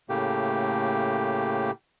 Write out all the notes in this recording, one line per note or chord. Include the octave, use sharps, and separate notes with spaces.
A2 C#3 A3 A#3 G4